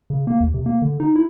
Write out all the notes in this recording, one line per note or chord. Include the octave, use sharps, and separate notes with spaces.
C#3
A#3
D#2
C3
A#3
D3
D#4
E4